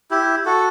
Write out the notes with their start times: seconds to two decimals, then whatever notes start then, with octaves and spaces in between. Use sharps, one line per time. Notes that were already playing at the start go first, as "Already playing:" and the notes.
0.11 E4 G4
0.45 F#4 A4